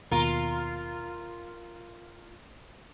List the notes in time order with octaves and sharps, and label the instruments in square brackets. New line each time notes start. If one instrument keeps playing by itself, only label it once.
[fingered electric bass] D#2 B2 [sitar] F4 A#4